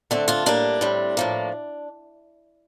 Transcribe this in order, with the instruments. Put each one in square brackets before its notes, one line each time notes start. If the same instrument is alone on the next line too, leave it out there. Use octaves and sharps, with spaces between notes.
[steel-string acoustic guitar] D3 A3 C4 D4
D4 F4
A2 G3 A#3 D4
A2 G3 C4
A2 F3 A#3